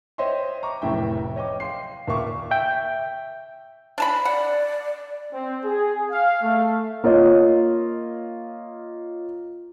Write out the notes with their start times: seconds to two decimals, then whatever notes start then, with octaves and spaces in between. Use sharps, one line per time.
0.18 C5 C#5 D#5 E5 G5 C6
0.63 A#5 C#6 D6
0.82 F1 F#2 A2 E5 G5
1.36 C#5 D#5 G5 D6
1.60 F5 G5 C6 C7
2.08 D#2 A#2 E5 F5 C#6 D6
2.51 E5 G5
3.98 D4 A5 B5
4.25 D5 F#5
5.33 C4
5.64 G#4
6.11 F5
6.41 A3
7.04 A#3 F4 C#5 D#5